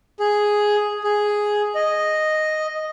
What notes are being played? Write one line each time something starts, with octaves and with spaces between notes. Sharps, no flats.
G#4
G#4
D#5